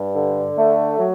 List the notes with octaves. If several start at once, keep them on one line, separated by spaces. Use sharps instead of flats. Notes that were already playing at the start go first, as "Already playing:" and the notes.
Already playing: G2
D3
A3
F#3